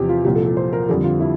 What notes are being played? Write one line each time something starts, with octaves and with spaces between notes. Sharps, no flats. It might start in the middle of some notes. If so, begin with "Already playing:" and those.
Already playing: E2 C3 F3 G4
F4
C2 A#2 F3 G4
A4
A4
C5
A#4
F2 D3 G3 A4
F4
E4